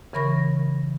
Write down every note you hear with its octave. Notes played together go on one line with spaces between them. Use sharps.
C#3 E3 A#4 B5 C#6 A#6